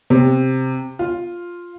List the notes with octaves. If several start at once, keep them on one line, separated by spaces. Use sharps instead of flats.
C3
F4